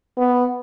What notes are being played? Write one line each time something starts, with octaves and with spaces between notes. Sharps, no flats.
B3